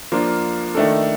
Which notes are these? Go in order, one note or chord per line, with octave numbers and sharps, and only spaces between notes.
F3 A#3 D4 F4
D#3 A3 D4 A4